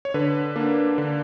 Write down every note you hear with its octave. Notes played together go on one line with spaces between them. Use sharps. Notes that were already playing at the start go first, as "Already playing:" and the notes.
C#5
D3 B4
A#3 D4
D3